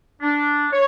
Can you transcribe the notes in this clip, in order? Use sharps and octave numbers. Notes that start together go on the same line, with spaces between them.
D4
C#5